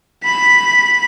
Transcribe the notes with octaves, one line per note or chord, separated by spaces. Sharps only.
B5 B6